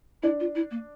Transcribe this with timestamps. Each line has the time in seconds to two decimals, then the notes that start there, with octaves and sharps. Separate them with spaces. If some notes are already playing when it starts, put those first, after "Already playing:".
0.22 D4 E4
0.40 F4
0.55 E4
0.71 A#3